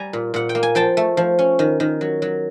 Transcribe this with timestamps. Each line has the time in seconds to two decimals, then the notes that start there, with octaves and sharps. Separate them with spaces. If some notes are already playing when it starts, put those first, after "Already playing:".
Already playing: G3 G#5 A#5
0.13 A#2
0.34 A#2 F#5
0.49 G5
0.55 A#3
0.63 G#5
0.75 F3 G5 A5
0.97 A3
1.17 F3
1.39 C#4
1.59 D#3
1.80 D#3
2.01 F#3
2.22 F#3